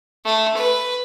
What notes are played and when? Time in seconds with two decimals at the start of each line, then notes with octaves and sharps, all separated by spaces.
0.25 A3
0.56 B4